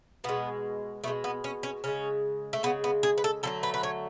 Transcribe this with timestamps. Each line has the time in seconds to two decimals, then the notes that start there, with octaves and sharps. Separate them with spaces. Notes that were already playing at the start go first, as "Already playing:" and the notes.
0.24 B2 G#3 B3
1.04 B2 G#3 A3
1.24 B3
1.44 C#4
1.63 C#4
1.84 C#3 G#3 C#4
2.53 A3
2.63 C#3 B3
2.67 G#3
2.84 B3
3.03 G#4
3.18 B4
3.24 A4
3.43 D3 F#3 A3 A4
3.63 B4
3.74 B4
3.83 C#5